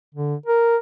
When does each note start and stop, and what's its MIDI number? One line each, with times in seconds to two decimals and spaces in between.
0.15 0.35 50
0.46 0.77 70